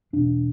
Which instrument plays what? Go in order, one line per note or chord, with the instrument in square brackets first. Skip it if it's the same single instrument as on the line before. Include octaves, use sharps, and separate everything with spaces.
[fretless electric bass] E2 B2 D4